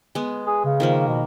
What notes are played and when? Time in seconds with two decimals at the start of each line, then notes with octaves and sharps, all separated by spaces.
0.15 G#3 B3
0.47 G#4
0.65 C#3
0.80 D#3 F3 A#3
1.08 B2